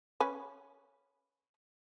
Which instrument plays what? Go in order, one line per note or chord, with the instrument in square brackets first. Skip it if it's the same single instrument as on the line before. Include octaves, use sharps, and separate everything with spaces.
[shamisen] C#4 B4